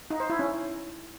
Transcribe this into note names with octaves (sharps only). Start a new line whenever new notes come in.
D#4
C5
E4
C#4